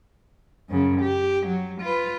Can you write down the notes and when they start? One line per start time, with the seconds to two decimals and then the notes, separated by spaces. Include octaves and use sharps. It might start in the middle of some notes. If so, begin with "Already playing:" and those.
0.69 F#2 C#3
1.01 G4
1.47 F#3
1.82 F4 B4